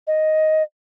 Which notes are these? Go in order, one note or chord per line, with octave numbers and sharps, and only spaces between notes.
D#5